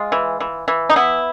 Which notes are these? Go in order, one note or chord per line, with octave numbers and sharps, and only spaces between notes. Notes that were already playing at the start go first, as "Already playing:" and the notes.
Already playing: G#3 F4
E3
E3
E3
D#4
B3 E4